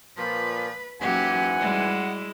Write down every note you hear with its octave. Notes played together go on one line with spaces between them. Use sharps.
A#2 F3 B4
G#2 E3 F#3 A#3 C#4 G4 F#5 G#5
G3 G#3 E4